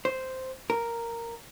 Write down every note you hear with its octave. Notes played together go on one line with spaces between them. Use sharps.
C5
A#4